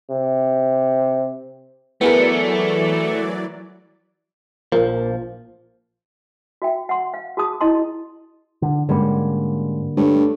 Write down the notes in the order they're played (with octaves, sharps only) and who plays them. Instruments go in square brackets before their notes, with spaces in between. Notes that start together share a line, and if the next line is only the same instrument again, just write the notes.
[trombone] C3
[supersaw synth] E3 F#3 D5 [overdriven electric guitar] A3 [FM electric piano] B3 [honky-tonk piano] E4 G#4 A#4
[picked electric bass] A#1 F3 [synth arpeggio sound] A#2 A#3
[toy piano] F#4 E5 G5
F#5 C6
F5
F#4 G#4 A5 D#6
E4 D#5 A5 C6
[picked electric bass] D3
[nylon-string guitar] G#2 C#4 [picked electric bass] D3 G3 A#3
[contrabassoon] G2 [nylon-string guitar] A3 C#5